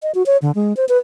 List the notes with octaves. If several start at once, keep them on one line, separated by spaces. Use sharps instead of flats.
D#5
F#4
C#5
D3
G#3
C5
B4